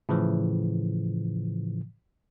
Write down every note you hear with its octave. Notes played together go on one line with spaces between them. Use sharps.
A2 C#3 E3 F3